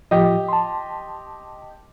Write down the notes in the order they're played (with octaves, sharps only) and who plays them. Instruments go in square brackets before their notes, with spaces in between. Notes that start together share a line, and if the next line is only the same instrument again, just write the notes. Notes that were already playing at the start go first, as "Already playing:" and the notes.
[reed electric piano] A2 F3 F4 [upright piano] G4 D#5
[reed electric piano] A5 C6